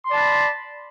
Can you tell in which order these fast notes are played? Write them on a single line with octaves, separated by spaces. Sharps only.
C6 D5 A5 B5